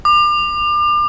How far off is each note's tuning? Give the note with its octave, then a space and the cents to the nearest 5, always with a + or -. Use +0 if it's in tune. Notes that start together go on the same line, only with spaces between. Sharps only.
D6 +35